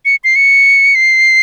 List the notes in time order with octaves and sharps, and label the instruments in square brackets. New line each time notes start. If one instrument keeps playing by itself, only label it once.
[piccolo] C#7
C7
C#7
C7